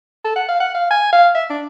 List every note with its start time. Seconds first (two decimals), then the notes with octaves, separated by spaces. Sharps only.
0.24 A4
0.36 F#5
0.48 F5
0.60 F#5
0.74 F5
0.91 G#5
1.12 F5
1.35 E5
1.50 D4